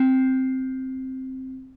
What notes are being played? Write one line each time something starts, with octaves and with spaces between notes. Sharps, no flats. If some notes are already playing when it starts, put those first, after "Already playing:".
Already playing: C4